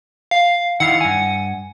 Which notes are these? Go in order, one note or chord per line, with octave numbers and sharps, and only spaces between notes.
F5
D#3 E4 F5 F#5
G2 G#5